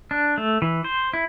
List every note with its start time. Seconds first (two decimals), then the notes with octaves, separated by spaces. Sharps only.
0.11 D4
0.38 A3
0.62 E3
0.84 C5
1.13 E4